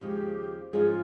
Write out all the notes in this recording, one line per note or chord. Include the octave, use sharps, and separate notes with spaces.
D#2 C#3 F3 G#3 G4
G#2 F3 G#3 C#4 F4 G#4